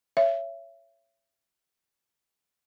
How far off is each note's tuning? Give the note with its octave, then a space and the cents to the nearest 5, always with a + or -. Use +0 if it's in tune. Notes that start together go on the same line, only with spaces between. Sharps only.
C#5 +0 E5 +25